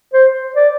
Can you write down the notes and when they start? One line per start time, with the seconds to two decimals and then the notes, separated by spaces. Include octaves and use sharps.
0.13 C5
0.56 D5